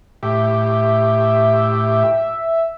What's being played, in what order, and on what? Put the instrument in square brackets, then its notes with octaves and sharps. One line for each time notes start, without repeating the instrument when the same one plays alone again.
[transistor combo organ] A2 G4 [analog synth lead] E5